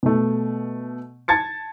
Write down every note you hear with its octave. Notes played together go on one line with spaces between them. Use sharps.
B2 A3
A5 G#6 A6 C#7